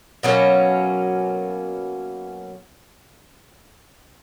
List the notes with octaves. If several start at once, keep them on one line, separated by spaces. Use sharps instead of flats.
B2 F#3 A#3 C#4